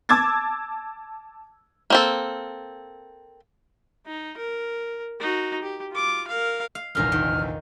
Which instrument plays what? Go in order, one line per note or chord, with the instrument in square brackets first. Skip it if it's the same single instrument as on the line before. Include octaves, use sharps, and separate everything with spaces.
[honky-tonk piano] A5 D6 E6 G#6 A6
[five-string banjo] A#3 C4 A4
[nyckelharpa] D#4
A#4
D#4 F#4
G4
F4 D6
A#4 F5
[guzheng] F5
[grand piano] F1 A#1 E2 [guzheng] D#4 A#4 F5 [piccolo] F6
[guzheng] D#3